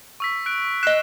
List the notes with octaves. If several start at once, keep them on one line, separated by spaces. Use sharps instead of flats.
C#6 E6 B6
F#6 D7
D#5 E6 F#6 C7 E7